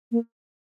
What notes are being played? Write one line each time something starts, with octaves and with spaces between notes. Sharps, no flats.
A#3